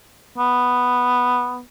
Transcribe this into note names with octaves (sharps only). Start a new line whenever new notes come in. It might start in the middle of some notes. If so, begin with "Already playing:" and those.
B3